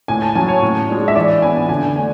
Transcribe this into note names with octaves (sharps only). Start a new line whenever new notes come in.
A2 G#5
A5
F#3 C#4 G#5
C#5
A2
G#3 D4
E5
E3 D5
B3 D4 G#5
D3 G#5
A3 D4 G#5